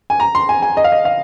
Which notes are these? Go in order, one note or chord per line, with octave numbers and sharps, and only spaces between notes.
G#5
A#5
C6
G#5
G#5
D#5
F5
D#5
F5